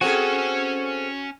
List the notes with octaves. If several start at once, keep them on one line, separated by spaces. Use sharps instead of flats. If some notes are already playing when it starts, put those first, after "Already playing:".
C4 C#4 F#4 G#4 A4 G#5